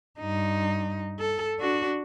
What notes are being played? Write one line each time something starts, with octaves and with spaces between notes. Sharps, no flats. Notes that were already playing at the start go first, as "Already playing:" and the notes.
G2 D#4
A4
D4 F#4